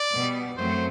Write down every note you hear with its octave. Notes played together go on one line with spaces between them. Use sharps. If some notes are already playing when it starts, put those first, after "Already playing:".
Already playing: D5
B2 G3 B3
F#2 F#3 A3 C4 C5